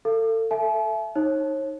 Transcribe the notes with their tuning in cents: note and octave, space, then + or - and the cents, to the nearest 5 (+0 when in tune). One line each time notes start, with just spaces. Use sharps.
A4 +30 F5 -30
A4 +0 E5 +20 A5 -45
D#4 +0 C#5 -35